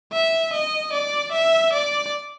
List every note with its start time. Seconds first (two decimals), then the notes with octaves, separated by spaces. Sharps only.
0.13 E5
0.53 D#5
0.93 D5
1.32 E5
1.73 D5